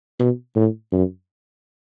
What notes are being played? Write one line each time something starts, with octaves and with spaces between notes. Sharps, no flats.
B2
A2
F#2